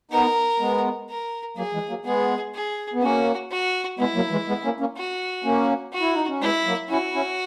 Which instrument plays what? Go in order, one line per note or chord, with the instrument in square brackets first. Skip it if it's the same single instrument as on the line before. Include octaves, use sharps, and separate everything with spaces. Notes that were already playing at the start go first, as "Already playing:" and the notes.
[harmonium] B3 D#4 [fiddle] A#4
[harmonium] G#3 B3
[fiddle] A#4
[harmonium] F#3 A#3 [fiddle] G#4
[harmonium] E3 G#3
F#3 A#3
[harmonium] G#3 B3 [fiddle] G#4
[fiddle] G#4
[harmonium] B3
[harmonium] A#3 C#4 [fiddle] F#4
[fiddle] F#4
[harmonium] G#3 B3 [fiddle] E4
[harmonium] F#3 A#3
E3 G#3
G#3 B3
A#3 C#4
A#3 C#4
[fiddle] F#4
[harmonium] A#3 C#4
[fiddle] F#4
[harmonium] E4
D#4
C#4
[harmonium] G#3 B3 [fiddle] E4
[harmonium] F#3 A#3
[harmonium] C#4 E4 [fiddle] F#4
[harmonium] C#4 E4